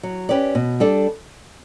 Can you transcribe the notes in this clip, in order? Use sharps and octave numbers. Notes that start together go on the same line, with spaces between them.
F#3
C#4 G4 B4 D5
B2
G3 D4 A4